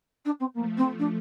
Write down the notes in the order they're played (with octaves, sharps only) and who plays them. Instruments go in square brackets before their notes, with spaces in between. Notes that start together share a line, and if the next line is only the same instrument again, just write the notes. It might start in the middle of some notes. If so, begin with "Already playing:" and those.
[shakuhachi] D4
C4
[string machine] F3 A3 [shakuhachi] A#3
[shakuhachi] C4
D4